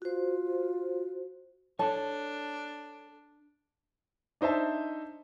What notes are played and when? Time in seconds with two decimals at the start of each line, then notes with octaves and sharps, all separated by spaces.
0.02 F4 F#4 C5
1.79 D4 A4 C#5 A5
4.41 D4 D#4 C5 E5 A5